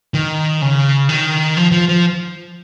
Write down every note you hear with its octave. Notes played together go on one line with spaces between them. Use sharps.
D#3
C#3
D#3
F3
F3
F3